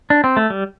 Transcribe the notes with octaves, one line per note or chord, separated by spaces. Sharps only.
D4
C4
A3
G3